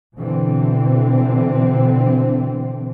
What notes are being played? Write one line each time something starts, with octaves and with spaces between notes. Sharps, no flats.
B2 D3 E3 C4